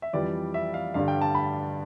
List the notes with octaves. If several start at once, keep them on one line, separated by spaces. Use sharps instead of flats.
E5
F2 E3 G3 D5
E5
F5
G2 D3 G3 F5
G5
A5
B5